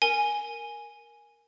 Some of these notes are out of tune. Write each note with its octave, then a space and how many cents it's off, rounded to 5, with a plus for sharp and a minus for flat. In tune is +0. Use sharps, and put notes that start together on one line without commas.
A#4 +0 G#5 +0